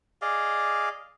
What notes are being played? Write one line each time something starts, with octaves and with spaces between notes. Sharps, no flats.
G#4 D5 D#5 F5